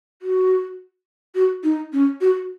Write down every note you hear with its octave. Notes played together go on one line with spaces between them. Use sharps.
F#4
F#4
D#4
C#4
F#4